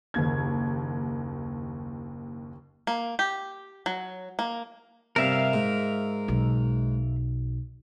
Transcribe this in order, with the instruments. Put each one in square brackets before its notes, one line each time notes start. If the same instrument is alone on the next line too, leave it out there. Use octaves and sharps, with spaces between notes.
[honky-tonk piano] F#1 D#2 G#6
[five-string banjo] A#3
G4
F#3
A#3
[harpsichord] G2 C3 [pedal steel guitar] A#4 E5 F5
[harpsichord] G#2
[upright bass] B1